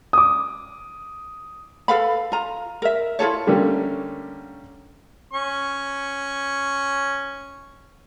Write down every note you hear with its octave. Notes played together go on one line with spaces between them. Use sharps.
D6 D#6
A4 B4 F5 B5
F4 A#5
A#4 E5
E4 F4 A4 C#5
D3 G3 A3 A#3 C#4
C#4 C#6